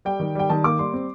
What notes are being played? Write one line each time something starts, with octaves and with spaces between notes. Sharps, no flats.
G3 G5
D#3
G3 G5
D#3 A5
A#3 D6
G3 C6
C4